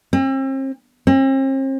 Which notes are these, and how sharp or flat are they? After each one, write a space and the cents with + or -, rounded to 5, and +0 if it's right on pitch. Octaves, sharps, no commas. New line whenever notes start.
C4 +40
C4 +45